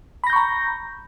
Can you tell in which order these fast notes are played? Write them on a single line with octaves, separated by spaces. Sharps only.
B5 A#6 G6 C#6 A#5